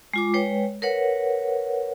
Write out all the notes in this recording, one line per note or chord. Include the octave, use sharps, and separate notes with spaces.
G#3 F4 D6
G#3 B4 C#5 G5
A#4 B4 C#5 F#5